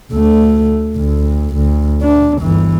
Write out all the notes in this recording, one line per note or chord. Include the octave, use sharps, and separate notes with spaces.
D2 A3
D2
D2
D4
G1 E3